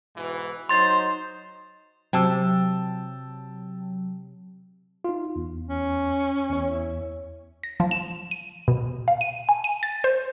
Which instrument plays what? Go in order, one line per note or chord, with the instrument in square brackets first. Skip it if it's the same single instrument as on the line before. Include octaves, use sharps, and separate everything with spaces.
[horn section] G#2 B2 E3
[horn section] F#3 D#4 C5 [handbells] C6 A6
[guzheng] C3 [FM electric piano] F#3 [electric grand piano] G5 A5 E6
[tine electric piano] D#4 F4
E2
[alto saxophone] C#4
[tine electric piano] E2 C#5
[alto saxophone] E4
[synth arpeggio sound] A#6
F3
E7
D#7
B2
F5
D#7
G#5
D#7
A6
C5